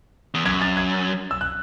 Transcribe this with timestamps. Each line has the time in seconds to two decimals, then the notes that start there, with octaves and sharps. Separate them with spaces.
0.34 E2
0.45 F#2 G#6
0.61 A6
0.77 G#6
1.31 E6
1.41 F#6